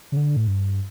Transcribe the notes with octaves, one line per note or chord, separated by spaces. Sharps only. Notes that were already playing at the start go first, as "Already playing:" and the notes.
C#3
D3
A2
G2